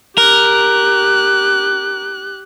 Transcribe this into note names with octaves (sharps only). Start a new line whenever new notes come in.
G4 A#4 F#6